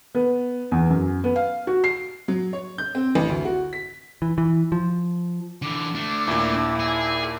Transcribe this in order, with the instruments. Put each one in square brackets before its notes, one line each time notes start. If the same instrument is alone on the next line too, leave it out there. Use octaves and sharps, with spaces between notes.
[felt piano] B3
E2
F#2
B3
F5
F#4
C7
[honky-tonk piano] F#3
C#5
G6
C4
A1
D2
F#4
B6
[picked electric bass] E3
E3
F3
[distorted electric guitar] D3 E3 [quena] D6
[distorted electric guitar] A3 D4
[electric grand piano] D#2 A#2 [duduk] E4
[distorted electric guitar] G#4